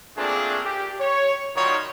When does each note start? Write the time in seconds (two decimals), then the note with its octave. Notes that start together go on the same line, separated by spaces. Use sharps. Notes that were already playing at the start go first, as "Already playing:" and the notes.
0.18 A3 A#3 C4 D4 F4 G#4
0.65 G4
1.01 C#5
1.56 D#3 G3 D#4 F4 F#4 C#5